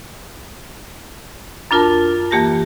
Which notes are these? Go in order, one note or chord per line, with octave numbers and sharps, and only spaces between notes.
F#2 D4 F4 A#4 A5
D#2 E3 A#3 G4 A5 A#6